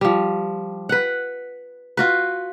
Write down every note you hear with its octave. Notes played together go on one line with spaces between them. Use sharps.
F3 G3
B4 F#5
F4 F#4 B4